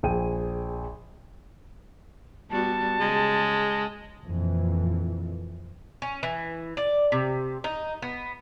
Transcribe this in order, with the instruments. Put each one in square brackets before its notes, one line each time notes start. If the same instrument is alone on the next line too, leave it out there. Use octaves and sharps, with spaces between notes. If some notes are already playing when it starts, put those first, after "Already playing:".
[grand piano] A#1 G#4 G5 D#7
[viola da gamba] G3 B3 F#4 [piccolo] A5
[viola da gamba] C#3 [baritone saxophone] G#3
[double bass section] F2 A#2 E3
[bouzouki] C#4
E3
D5
C3
D#4
B3